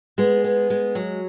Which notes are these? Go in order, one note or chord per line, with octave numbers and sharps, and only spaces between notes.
G#3 B3 G#4
B3
G#3
F#3